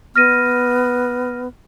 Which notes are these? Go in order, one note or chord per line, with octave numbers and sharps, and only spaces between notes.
B3 F6 A#6 D#7